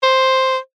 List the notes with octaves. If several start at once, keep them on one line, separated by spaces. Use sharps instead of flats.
C5